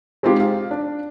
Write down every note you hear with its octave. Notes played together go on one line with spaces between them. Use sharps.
G#3 C4 D#4 F4 G4 G#4
F5
D4